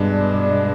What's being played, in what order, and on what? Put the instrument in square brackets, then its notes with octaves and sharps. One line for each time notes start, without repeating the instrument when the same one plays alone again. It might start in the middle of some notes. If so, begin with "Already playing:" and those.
Already playing: [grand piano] G2 [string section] B2 G#3 D4